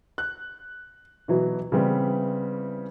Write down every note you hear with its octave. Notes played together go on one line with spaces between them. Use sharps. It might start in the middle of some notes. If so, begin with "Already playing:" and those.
F#6
B2 E3 F#3 B3
C#3 E3 G3 B3 C4